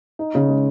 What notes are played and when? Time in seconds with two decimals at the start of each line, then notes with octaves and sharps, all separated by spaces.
0.19 D#4
0.35 C#3
0.49 G#3